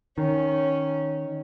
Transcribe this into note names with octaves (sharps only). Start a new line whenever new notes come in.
D#3 C#4